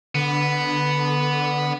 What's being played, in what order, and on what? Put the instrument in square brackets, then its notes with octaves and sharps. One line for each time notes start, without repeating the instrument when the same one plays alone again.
[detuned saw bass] D3 [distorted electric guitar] B3